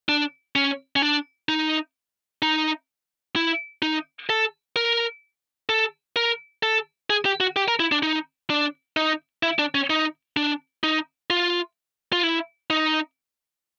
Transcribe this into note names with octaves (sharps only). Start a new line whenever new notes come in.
D4
C#4
C#4
D4
D#4
D#4
E4
D#4
A4
A#4
A4
A#4
A4
G#4
G4
F#4
G4
A#4
E4
D4
D#4
D4
D#4
E4
D4
C#4
D#4
D4
D#4
F4
F4
E4
D#4